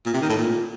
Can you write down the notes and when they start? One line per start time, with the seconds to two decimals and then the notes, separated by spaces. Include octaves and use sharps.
0.06 A#2
0.14 C3
0.21 D#3
0.29 A2
0.37 A#2